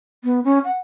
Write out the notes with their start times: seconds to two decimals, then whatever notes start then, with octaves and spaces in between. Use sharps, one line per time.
0.24 B3
0.44 C#4
0.65 F#5